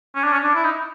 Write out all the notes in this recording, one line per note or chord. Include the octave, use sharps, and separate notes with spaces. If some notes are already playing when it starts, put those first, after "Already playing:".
C#4
D4
C#4
D4
E4
D#4